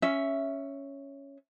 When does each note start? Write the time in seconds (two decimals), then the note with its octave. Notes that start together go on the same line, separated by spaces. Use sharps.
0.02 C#4 E5